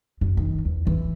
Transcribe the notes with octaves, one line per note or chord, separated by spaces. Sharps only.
F#2
D#3
E2
E3